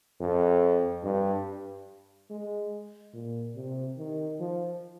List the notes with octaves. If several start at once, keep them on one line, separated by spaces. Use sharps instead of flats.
F2
G2
G#3
A#2
C3
D#3
F3